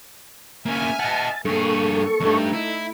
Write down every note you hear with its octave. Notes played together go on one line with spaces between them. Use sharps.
A#3 C#4 E5 G#5 F6
D#5 F#5 A5
G2 A#3 G#4 A4 C#6
E2 G2 A3 D#4
E4